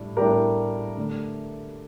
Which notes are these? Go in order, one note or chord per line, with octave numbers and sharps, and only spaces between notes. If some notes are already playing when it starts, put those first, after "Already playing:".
Already playing: A2 G3 D4
A2 G3 D4 G4 A#4
D3 A3 D4